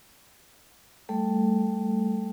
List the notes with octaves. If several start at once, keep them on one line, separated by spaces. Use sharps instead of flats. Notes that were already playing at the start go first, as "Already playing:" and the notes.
G3 A3 A4